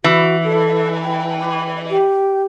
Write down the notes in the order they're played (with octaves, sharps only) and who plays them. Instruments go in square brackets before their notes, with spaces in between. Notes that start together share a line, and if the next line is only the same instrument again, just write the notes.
[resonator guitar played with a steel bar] E3 [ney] F#4
[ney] A4
G5
G4